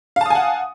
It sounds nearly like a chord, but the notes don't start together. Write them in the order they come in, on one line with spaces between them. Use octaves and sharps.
F5 A5 D#6 G#5 F#5